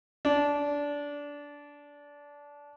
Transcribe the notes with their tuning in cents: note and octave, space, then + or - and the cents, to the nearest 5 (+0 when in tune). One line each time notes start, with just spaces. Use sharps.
D4 -20